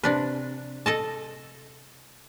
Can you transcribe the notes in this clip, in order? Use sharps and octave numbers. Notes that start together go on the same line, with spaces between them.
C3 D4 B4
A4 D#5 A5